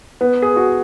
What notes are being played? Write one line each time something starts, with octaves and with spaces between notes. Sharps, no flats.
B3
G#4
F#4